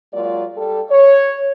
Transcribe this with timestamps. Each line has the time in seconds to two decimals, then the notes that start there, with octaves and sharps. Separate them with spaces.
0.14 F#3 G#3 A#3 F4 A#4 D5
0.56 G3 G4 A4
0.90 C#5